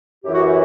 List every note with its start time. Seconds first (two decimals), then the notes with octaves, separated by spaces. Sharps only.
0.24 F#2 E3 G4
0.33 F#4
0.41 G4